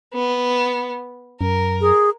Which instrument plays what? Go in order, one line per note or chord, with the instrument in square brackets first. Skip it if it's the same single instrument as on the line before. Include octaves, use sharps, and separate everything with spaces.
[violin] B3
[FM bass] F#2 [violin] A#4
[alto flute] G#4